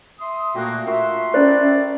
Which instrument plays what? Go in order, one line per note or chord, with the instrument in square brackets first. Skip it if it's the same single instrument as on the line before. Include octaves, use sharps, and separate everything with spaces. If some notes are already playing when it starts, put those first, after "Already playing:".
[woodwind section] E5 C6 D#6
[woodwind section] A#2 A#3 F#4 [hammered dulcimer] A3 G5 A#5
[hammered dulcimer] F4 F#4 A#4 [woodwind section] E5 C6
[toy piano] C#4 C5 [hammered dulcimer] E4 A4 A#4 [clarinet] D5